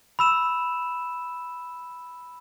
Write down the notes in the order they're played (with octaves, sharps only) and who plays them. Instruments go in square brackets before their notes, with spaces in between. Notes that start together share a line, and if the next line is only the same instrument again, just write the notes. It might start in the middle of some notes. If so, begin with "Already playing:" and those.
[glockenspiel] B5 E6 E7